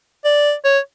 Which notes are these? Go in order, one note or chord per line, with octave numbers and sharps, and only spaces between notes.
D5
C#5